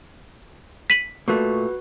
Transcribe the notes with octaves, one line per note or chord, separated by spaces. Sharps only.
B6 D#7 F#7
A#2 A3 F#4 B4